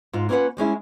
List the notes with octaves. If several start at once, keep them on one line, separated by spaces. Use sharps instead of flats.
G#2 F4
A#3 B3 C#4 F4 B4 F#5
G3 G#3 C#4 E4